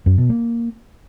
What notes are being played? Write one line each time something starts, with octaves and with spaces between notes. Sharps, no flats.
F#2
B2
A#3